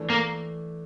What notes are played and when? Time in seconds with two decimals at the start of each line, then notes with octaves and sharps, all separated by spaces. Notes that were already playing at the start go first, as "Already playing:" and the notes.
Already playing: E3 A3 D4
0.10 A#3